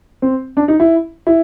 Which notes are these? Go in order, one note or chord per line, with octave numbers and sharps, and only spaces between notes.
C4
D4
D#4
E4
E4